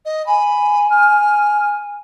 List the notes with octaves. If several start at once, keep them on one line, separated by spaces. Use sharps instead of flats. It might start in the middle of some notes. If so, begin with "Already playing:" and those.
D#5
G#5 B5
F6